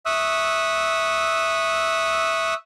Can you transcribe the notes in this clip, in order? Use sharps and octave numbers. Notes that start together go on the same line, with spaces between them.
E5 C#6 D#6 E6 F#6